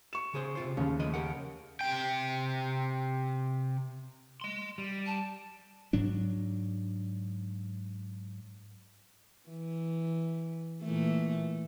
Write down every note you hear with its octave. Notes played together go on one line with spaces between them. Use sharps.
C#6 E7
C#3 G#4 C5
C3 F4 C5
D#2 C#3 C#4
F3 A3 D#5
G4 A#4 F#5
C3 G5
D#5 C6
G3
A5
G#2 F#3 D4
E3
A#2 E3 A3